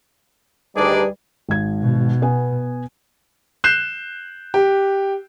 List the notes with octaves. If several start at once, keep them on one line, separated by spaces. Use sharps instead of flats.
D2 D#3 G3 D4 D#4 G#4 B4 D5
G#1 G#6
B2
B3 G#5
F#6 G6 C7 E7
G4